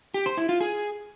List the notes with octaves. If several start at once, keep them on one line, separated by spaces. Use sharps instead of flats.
G4
C5
E4
F4
G#4